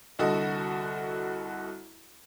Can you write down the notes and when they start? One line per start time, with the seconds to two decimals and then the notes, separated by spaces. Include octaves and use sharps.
0.19 C2 D3 F#4 A4 D#5